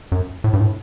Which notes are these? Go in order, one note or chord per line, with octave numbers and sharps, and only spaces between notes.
F#2
A2
G2
A2